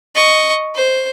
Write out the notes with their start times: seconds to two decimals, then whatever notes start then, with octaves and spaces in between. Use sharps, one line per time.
0.15 D#5 C#6
0.75 C5